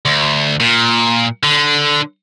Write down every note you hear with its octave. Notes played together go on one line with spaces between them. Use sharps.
D2
A#2
D3